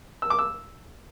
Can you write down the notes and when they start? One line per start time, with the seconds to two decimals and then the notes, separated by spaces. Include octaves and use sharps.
0.22 E6
0.30 D6
0.39 E6